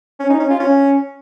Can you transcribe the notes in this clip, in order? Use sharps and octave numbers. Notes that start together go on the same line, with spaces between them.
C#4
D#4
C#4
F4
C#4